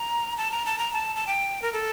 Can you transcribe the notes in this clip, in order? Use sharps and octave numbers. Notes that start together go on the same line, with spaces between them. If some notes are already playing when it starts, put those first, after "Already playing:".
Already playing: A#5
A5
A#5
A5
A#5
A5
A5
G5
A#4
A4